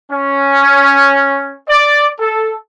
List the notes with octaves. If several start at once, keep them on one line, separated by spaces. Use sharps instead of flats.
C#4
D5
A4